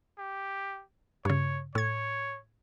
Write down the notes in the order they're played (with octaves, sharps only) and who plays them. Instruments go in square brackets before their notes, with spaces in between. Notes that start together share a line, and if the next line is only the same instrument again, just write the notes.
[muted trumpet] G4
[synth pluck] G2 C#3 [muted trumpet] C#5
[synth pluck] A2 G#6 [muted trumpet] C#5